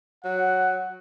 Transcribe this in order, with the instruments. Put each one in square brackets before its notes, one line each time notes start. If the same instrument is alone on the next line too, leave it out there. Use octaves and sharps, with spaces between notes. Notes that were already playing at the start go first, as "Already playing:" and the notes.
[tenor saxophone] F#3 [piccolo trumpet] F#5